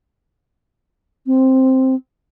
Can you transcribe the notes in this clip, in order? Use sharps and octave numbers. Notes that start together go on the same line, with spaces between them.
C4